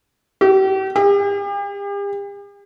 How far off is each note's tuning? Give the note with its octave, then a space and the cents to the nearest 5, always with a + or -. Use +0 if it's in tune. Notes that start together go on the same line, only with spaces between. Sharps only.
G4 -35
G4 +45